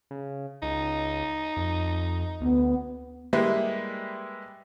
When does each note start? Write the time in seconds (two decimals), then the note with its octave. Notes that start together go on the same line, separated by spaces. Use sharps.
0.11 C#3
0.62 C#2 D#4
1.57 F2
2.41 D2 B3
3.33 G3 G#3 A#3 E4 B4 E5